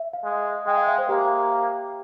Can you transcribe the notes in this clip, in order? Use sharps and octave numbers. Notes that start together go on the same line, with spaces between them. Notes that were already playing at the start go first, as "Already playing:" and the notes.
Already playing: E5
F5
G#3
G#3 G5
F5
E5
C5
A#3 G4